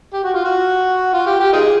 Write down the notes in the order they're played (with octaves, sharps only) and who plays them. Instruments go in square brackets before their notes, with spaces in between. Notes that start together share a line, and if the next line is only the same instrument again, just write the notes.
[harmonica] G4
F#4
F4
F#4
F4
G4
G4
D#4 F4 G#4